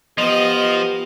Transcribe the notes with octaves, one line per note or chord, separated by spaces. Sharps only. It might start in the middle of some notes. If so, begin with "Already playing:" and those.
F3 B3 G4 D#5